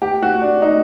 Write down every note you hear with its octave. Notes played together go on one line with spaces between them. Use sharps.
G4
F#4
D4
D#4